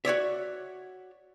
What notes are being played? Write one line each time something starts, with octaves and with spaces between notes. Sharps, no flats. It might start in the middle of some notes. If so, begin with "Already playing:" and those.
F#4 C#5 D5 E5